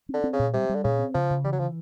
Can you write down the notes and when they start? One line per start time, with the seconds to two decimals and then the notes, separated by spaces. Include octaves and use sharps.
0.09 C4
0.14 D3
0.24 C4
0.33 C#3
0.39 A#2
0.54 C3 G3
0.69 G3
0.75 D3
0.84 A#2 C#3
0.99 C4
1.14 C#3 F3
1.30 C#3
1.45 E3 G3
1.52 F#3
1.60 E3 F3